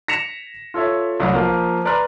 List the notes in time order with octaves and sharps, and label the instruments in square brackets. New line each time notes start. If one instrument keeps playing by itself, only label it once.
[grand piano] A#6 B6 C#7 E7 F7
F4 A4 C#5 E5
C2 F#3 A3
F3 A#3 A#4 F5
B4 D5 A#5 C6 F6 F#6